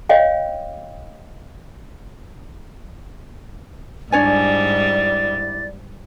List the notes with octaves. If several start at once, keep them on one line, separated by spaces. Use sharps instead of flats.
C#5 D#5 F5 G5
G#2 G3 D4 E4 C#5 D5 G#5 A6